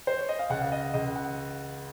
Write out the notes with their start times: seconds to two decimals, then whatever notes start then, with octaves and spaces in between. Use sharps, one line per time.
0.07 C5
0.18 C#5
0.29 D#5
0.39 F5
0.50 C#2 F#5
0.62 F5
0.72 D#5
0.94 C#2 D#5
1.16 F#5